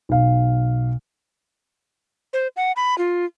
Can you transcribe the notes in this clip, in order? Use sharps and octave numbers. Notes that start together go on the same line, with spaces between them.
B1 F5
C5
F#5
B5
F4